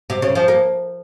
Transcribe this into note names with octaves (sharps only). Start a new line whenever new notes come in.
C3
C#3
F3
A#3